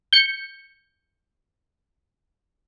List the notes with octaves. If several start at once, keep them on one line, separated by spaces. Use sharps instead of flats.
G6 C#7